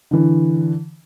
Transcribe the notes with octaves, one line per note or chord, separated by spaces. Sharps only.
D3 E3